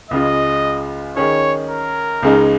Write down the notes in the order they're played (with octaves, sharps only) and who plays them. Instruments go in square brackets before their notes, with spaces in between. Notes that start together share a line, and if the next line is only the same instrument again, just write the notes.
[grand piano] C#2 C#3 G#3 F4 [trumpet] D#5
[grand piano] D#3 C#4 G#4 [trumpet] C#5
[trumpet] A#4
[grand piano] C#2 C#3 G#3 D#4